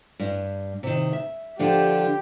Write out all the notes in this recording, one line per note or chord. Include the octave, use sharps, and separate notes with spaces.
G2
C3 D#3
E5
D3 F3 D4 G4